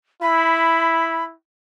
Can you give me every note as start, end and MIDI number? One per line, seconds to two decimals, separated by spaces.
0.22 1.34 64
0.22 1.24 83